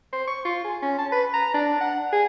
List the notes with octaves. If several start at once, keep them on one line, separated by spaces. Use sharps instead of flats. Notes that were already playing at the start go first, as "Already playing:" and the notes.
C5
C#6
F4
G#4
C#4
A5
B4
A#5
D4
F#5
G#4